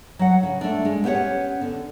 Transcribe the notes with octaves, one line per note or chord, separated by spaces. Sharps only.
F#3 F#5
C#3
A3 D4
G#3
B3 C#4 G4 C5 C#5 F#5
D3